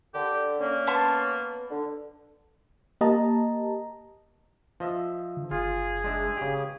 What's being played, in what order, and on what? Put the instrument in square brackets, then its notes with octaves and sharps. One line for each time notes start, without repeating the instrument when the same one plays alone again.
[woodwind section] D3 [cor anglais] G4
[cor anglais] A#3 [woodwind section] C#4
[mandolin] B3 A5 C6
[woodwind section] D3
[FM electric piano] A#3 G4 D#5 A5 A#5
[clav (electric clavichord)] F3 D#5 E5
[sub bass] D3
[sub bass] F#1 [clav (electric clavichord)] F4 [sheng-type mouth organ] G#4
[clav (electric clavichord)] G#3 D4 E5
C#3 G4